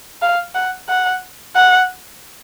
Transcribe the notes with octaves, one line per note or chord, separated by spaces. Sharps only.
F5
F#5
F#5
F#5